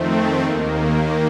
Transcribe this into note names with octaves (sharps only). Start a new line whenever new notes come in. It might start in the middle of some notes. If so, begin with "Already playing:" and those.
Already playing: F2 D#3 A3 C4
D#2 D#3 A#3